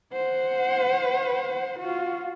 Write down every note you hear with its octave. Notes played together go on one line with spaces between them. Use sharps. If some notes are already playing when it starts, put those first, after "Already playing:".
C5 F#5
F4 F#4